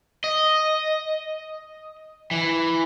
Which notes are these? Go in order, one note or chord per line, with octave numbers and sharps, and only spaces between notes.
D#5
E3